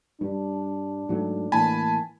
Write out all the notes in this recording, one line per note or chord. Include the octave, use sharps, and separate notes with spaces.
G2 G3 D4
G#2 F#3 A3
A2 E3 A#3 G#5 A5 B5